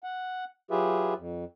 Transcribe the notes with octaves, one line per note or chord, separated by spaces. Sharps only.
F#5
F#3 F4 G4 G#4 B4 E5
F2